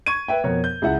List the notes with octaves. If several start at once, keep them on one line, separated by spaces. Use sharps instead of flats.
C#6 G#6 D#7
B4 E5 G5
F2 B2 A#4 C#5
G6
C#2 E4 F#5